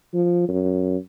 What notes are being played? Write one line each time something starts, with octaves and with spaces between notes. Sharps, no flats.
F3
F#2